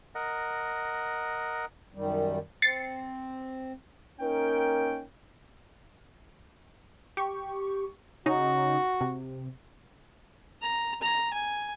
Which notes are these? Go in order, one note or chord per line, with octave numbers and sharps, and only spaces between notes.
A#4 D#5 F#5
F#2 D#3 G3
C4 A6 C7 C#7
A#3 C#4 D#4 A#4 G5
G4 C#6
C#3 C#4 D#4 F#4
C3
A#5
A#5
G#5